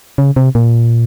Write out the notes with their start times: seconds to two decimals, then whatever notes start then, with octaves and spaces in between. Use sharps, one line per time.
0.18 C#3
0.36 C3
0.55 A#2